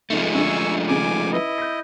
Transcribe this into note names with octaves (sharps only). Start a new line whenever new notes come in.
F1 G#2 F3 G#3 A3
F#2 D3 G#5 C#6 E6
D#2 C#3 G#5 D6
E4 B4 D#5
G6 A#6